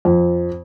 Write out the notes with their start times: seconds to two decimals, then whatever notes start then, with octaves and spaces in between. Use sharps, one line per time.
0.05 F2